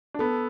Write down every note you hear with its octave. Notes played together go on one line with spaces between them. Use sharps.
D4
B3 A4